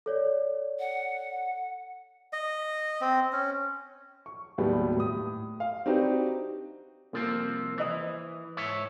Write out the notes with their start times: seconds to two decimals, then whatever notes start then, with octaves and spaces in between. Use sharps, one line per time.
0.06 A4 C#5 D5
0.80 F#5
2.33 D#5
3.01 C4
3.33 C#4
4.26 C#6
4.58 D#2 A2 F#3 G3 B3
4.97 A2 D#6
5.60 F5
5.86 C4 D4 D#4 F#4 G4 B4
7.13 C2 F3 A#3 C4
7.78 E3 C5 D#5 D#6
8.57 G#2 C#5 E5